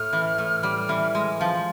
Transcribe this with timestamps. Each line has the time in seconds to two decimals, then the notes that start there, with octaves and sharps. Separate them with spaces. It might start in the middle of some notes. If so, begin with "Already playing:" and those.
Already playing: A2 F6
0.13 E3
0.38 A2
0.63 G3
0.89 E3
1.15 G#3
1.41 F3